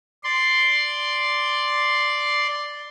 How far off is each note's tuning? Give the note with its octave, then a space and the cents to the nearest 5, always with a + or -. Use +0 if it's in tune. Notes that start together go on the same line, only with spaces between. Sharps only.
D5 +0 C6 +0